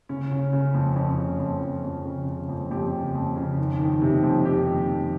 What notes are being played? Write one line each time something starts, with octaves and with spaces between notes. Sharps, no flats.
C#3 C#4
C#3
C#3
F2
F2 C#4
C#3
F2
F2
F2
C#3
C#3
F2
F2 G4
C#3
F2
C#3
D#3
D#3
C3
F2
D#3 G4
F2
F2